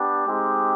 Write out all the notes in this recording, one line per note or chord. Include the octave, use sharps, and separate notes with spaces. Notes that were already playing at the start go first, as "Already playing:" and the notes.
Already playing: B3 D4 G4
G#3 C4 D#4 G4